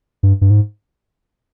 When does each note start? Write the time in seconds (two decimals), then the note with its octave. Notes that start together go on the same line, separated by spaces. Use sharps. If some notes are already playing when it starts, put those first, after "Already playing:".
0.23 G2
0.41 G2
0.50 G#2